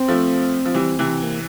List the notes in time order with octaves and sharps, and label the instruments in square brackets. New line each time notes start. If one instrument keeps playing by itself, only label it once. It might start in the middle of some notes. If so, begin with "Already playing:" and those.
Already playing: [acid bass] C4
[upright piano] F3 A3
F3
E3 G3
C3 E3
[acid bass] A#3